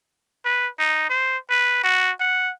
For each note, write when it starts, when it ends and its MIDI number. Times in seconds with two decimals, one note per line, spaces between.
0.45 0.68 71
0.79 1.05 63
1.10 1.37 72
1.50 1.80 71
1.83 2.11 66
2.20 2.51 78